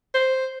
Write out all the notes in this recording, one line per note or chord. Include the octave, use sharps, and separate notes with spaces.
C5